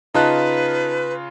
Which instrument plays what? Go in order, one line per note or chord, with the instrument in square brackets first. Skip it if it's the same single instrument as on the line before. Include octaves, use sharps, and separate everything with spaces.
[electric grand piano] C#3 F4 F#6 [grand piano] D#4 A5 [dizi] B4